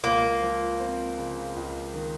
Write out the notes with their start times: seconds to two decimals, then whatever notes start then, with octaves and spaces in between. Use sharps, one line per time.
0.03 C#2 A#3
0.42 F3
0.80 C4
1.18 C#3
1.56 C#2
1.94 D#3